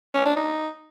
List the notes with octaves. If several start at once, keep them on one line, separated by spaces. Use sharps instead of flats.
C#4
D4
D#4